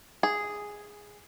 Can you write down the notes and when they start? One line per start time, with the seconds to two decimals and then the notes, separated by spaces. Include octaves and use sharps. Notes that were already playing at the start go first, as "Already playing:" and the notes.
0.23 G#4